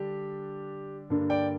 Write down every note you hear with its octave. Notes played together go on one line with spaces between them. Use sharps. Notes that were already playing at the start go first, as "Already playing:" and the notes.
Already playing: D3 G3 D4 G4
G2 D3 A#3 D4
D5 G5